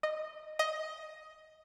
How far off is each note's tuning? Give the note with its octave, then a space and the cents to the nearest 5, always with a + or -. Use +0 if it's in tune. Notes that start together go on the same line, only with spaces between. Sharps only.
D#5 -10
D#5 +10